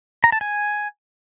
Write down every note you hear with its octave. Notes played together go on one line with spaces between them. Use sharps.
A#5
A5
G#5